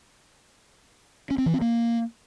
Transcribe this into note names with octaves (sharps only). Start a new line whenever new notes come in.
C#4
C4
E3
C4
A#3